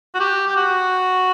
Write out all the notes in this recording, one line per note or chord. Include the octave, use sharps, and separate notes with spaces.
F#4
G4
G4
F#4